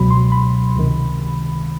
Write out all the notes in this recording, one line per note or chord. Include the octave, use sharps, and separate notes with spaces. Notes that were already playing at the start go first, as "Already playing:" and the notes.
Already playing: C#2 B2 F#3 B5
C6
B5
C#2 C3 D#3